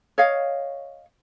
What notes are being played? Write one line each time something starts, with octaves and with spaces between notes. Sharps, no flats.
C#5 D#5 F5